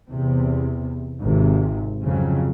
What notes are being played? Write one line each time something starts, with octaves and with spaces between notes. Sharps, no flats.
E2 C3
G#1 C3
F2 C#3 F#3